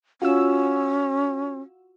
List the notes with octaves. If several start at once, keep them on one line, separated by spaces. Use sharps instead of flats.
C#4 F4 F#4 E6